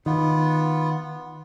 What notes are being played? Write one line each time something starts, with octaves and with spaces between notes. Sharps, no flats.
D#3 B3 F4